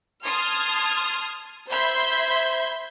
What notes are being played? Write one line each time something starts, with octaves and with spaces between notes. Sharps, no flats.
A5 C6 D#6 F6 G#6
C5 E5 B5 C6 G6 G#6